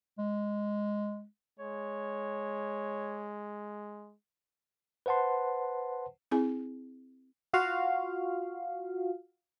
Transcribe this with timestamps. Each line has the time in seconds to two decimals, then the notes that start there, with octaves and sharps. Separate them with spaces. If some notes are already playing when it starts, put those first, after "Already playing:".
0.19 G#3
1.59 G#3 C#5
5.06 B4 C5 F#5 A5 C6
6.31 C4 E4 G#4 G#5
7.53 F4 F#4 F5